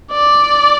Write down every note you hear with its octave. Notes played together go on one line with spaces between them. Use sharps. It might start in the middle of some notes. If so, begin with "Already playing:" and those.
D5